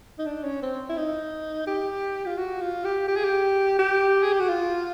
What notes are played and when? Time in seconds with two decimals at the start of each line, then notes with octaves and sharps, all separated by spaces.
0.18 D#4
0.26 D4
0.44 C#4
0.62 C4
0.89 E4
0.97 D#4
1.67 G4
2.26 F4
2.37 F#4
2.61 F4
2.84 G4
3.08 G4
3.16 G#4
3.24 G4
3.79 G4
4.23 G#4
4.32 G4
4.40 F#4
4.48 F4